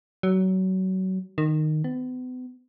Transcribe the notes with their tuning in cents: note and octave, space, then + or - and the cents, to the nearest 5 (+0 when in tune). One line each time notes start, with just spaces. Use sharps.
F#3 +25
D#3 -15
B3 +40